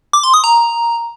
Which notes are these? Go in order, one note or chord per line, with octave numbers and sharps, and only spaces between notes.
D6
C6
D#6
A#5